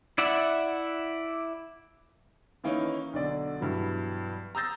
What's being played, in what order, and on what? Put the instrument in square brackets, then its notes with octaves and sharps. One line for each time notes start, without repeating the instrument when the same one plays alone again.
[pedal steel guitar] E4 D5 E5 F#5
[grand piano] D#3 E3 A#3 C#4 D#4
B1 D3 D5
G2 B2 E3 F#3
A#5 D#6 E6 G6 A6 A#6